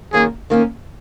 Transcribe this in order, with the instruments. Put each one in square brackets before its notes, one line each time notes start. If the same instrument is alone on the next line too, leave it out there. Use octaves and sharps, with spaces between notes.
[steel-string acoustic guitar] F#2 D#3 A#3 [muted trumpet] G#4
[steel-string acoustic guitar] D#3 A#3 C#4